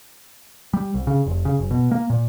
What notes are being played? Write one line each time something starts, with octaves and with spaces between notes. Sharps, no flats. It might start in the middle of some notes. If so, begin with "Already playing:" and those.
G3
C2
C#3
F1
C#3
F#1
B2
A#3
A#2